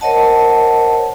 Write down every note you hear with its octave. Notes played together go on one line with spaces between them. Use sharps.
A#4 C5 C#5 D#5 F#5 A5